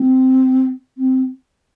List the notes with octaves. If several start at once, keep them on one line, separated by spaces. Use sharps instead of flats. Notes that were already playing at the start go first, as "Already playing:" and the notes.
Already playing: C4
C4